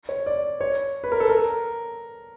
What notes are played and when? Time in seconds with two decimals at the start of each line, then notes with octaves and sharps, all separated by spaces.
0.09 C#5
0.26 D5
0.61 C#5
1.04 B4
1.12 A#4
1.20 A4
1.29 A#4